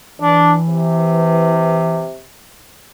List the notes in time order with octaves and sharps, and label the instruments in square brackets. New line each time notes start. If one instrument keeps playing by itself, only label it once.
[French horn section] E3 [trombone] D4
[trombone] C3